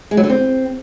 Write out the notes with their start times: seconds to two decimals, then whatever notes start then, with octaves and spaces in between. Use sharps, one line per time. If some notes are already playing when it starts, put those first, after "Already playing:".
0.11 G#3
0.17 F#3
0.23 D3
0.30 C4